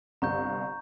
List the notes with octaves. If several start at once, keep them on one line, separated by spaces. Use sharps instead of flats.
G1 C2 A#5 C#6 G6